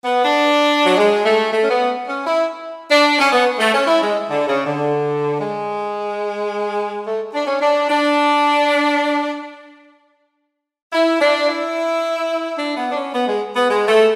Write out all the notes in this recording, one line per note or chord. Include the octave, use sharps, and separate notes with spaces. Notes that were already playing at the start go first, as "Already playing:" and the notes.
B3
D4
F#3
G#3
A3
A3
C#4
B3
C#4
E4
D4
C#4
B3
A3
C#4
E4
G#3
D3
C#3
D3
G#3
A3
D4
C#4
D4
D4
E4
D4
E4
D4
B3
D4
C#4
B3
G#3
B3
G#3
A3